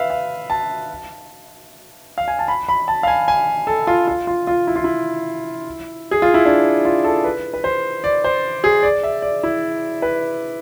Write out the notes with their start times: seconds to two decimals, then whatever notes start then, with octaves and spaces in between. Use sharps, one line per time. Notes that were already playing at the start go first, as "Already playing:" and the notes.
Already playing: B4 E5 F5
0.10 F5
0.50 A5
2.18 F5
2.28 G#5
2.39 A5
2.48 B5
2.69 B5
2.88 A5
3.03 F5
3.07 G#5
3.28 G#5
3.67 A4
3.87 F4
4.07 F4
4.27 F4
4.47 F4
4.67 E4
4.76 F4
4.84 E4
6.11 G#4
6.22 F4
6.34 E4
6.45 D4
6.85 F4
7.04 A4
7.24 B4
7.54 B4
7.64 C5
8.04 D5
8.24 C5
8.64 G#4
8.83 D5
9.03 E5
9.22 D5
9.43 E4
10.02 B4